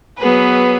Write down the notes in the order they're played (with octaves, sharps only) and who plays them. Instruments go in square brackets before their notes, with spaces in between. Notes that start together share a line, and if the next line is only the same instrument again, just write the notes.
[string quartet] F#3 B3 G#4 B4